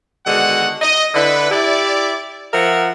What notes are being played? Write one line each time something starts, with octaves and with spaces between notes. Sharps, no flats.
B2 D3 D#3 G#3 F#4 F#5
D#5
D3 E4 B4
E4 G4 D5
F3 A#4 E5 F#5